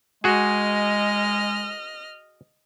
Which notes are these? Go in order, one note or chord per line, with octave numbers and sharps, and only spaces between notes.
G#3 F#4 G#4 D#5 F6